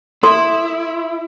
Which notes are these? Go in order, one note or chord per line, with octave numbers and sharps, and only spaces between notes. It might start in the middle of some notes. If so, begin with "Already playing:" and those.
E4 A4 C6